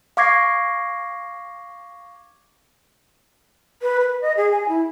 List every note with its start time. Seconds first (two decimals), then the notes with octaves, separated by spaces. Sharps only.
0.17 F5 C#6 D6 G#6 A#6 C7
3.82 B4
4.01 B4
4.21 D#5
4.37 G#4
4.51 G#5
4.69 E4